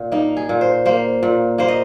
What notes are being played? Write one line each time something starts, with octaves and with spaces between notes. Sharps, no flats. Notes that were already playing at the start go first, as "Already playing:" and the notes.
Already playing: A#2
A#3 D#4
G#4
A#2
C5
A#3 C5
A#2
A#3 C5
D#5